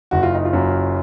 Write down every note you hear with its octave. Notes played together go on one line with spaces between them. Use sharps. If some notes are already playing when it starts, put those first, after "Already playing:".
F#1 F#4
F4
D#4
F4
F#2